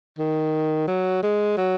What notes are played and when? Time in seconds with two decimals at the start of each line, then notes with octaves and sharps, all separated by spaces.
0.19 D#3
0.88 F#3
1.23 G#3
1.57 F#3